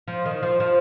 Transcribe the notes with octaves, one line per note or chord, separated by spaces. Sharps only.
F3
D#3
F3
F3